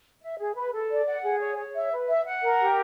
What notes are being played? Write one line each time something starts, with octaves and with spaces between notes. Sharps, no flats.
E5
G#4
B4
A4
D5
F#5
G#4
C#5
C#5
E5
B4
E5
F#5
A#4
G4